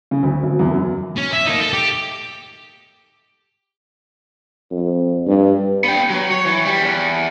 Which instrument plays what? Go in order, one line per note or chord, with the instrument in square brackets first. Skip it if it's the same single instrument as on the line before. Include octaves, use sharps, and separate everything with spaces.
[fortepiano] C#3
D2
G#1
E2
F#2
[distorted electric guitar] C#4
E5
A#3 D#4
A4
G4
[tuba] F2
G2
[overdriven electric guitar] B3 G5
F#3
C#5
E3
G3
E2